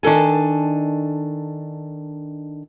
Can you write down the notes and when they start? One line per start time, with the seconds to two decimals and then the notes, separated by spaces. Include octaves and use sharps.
0.03 D#3 D4 A4 G#5